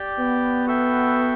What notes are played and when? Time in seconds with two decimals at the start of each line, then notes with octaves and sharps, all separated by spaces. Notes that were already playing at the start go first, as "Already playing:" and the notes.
Already playing: G4 D5 G5
0.20 B3
0.66 F#4 A4 E5 G5